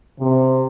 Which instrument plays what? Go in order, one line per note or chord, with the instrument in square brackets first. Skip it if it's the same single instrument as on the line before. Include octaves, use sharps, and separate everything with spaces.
[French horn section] C3